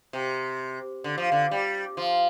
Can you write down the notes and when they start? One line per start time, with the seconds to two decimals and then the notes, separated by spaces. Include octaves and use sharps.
0.13 C3
1.04 D3
1.18 F3
1.32 D3
1.51 G3
1.97 F3